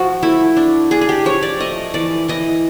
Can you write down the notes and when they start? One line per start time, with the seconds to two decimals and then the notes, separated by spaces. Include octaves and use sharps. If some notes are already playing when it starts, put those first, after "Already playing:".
Already playing: F3 F#4
0.23 A3 E4
0.57 D4
0.91 D4 G#4
1.01 G#4
1.09 G4
1.25 F3 C#5
1.43 D5
1.60 A3 D#5
1.94 E3 D5
2.28 E3 D#5